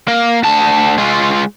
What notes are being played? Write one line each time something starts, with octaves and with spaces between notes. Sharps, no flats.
A#3
D2 A5
G#3 F4